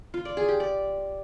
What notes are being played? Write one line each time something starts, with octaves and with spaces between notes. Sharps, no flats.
F4
D5
G#4
G4
D5